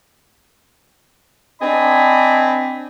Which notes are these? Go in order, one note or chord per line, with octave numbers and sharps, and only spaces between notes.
C4 D4 D#5 G#5 B5